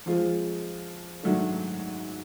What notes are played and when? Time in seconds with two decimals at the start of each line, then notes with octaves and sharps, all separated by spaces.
0.06 F3 G#3 C4 F4
1.23 G#2 D#3 F#3 A3 D4